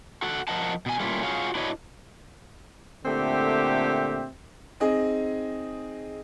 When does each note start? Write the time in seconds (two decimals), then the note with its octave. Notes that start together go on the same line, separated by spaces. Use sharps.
0.22 F#4 A4 F#5
0.48 F3 A#4 D#5 F#5 A5
0.86 B2 G#5
1.00 G3 A3 A#3 C#4 E4 F4
1.23 F4 F#4 G#4 C#5 F5
1.55 D4 E4 F#4 B4 C#5 D#5
3.05 A#2 D3 A3 C4 G4 E5
4.80 C4 D#4 G#4 D#5